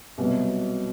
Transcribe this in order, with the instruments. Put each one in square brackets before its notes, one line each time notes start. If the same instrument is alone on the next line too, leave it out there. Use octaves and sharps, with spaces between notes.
[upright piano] C2 B2 F#3 B3